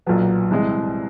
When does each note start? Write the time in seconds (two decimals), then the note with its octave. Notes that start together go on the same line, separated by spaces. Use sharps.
0.06 B1 A#2 F#3 B3
0.51 C2 C3 E3 G#3